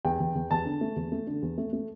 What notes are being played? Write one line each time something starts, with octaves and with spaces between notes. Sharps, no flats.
E2 G5
E2
E2
E2 A5
D3
A3
E2
A3
D3
E2
A3
A3